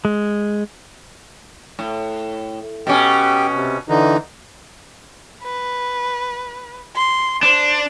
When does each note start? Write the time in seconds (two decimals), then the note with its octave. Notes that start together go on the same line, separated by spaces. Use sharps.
0.05 G#3
1.79 A2
2.87 B2 C#4 G4 G5
3.54 C3
3.89 D3 E3 D#4
5.43 B4
6.96 C6
7.43 D4 C5